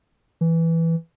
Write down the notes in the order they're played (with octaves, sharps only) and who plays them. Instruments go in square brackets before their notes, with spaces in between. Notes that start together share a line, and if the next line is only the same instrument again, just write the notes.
[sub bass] E3